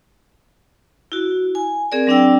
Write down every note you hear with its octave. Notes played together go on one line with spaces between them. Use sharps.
E4 F#4
G#5
C4 G#4 A#4 D5
F#3 C4 D4 D5 G5 E6